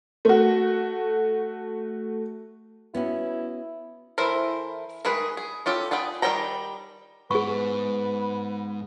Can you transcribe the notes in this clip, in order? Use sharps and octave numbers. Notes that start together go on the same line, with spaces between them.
A3 F#4
B3 C#4 E4 F#4
E3 E4 A4 A#4 C5
D#3 G#3 G#4 B4
G#4
C#4 F4 G4 A4
B3 F4 G#4 G5
D#3 G3 C5 G5 A#5
G#2 B3 G#4 B4 C#6